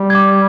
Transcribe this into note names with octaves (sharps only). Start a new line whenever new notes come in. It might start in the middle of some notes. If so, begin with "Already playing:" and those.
Already playing: G3
D6 G#6